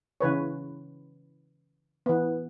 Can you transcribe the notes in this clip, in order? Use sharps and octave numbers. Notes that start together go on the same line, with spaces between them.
C#3 E3 B4 C#5
E3 B3